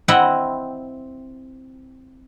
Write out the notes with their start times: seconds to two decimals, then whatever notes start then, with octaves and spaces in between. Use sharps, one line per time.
0.08 C4 E4 D#5 E5 F#5 G5